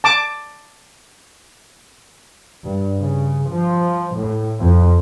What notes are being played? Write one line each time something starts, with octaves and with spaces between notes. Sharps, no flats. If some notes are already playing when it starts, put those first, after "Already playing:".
A5 D6
G2
C#3
F3
A2
F2